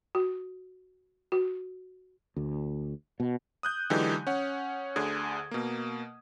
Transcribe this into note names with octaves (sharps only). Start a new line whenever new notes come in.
F#4
F#4
D2
B2
D#6 F#6 G6
D3 E3 F#3 G#3 D#4 G4
C#4 C#5 F#5
D2 D3 G#4 D#6 G#6
B2 A#3